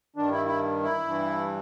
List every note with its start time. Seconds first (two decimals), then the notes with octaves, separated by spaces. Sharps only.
0.16 G2 D#3 D4
0.32 E4
0.46 E4
0.83 E4
1.04 G2 E3